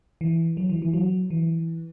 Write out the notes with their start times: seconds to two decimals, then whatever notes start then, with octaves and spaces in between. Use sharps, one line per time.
0.21 E3
0.57 F#3
0.69 E3
0.82 E3
0.93 F#3
1.30 E3